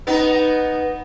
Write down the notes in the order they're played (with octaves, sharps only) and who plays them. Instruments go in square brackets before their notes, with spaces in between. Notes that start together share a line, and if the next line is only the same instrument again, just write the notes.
[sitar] B3 D#4